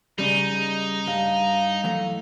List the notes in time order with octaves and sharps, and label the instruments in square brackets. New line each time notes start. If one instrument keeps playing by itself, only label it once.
[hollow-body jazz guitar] C#3 G3 [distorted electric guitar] D#4
[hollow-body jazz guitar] G2 [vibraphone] F5
[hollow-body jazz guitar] E3 F#3 A3